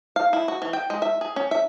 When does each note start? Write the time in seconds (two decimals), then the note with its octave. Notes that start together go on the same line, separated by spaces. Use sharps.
0.16 F5
0.33 E4
0.48 F#4
0.62 E3
0.73 G5
0.90 G#3
1.02 E5
1.21 G#4
1.36 C#4
1.51 E5